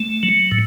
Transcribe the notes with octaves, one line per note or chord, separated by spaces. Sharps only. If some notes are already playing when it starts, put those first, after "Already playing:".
Already playing: A3
F#3
A2